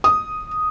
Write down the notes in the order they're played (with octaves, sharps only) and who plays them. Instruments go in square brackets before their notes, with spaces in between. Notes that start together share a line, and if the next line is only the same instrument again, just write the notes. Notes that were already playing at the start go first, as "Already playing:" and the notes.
[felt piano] D#6